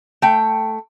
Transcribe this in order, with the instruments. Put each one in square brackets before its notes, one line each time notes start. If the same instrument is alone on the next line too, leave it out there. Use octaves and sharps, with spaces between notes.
[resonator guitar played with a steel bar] A3 G5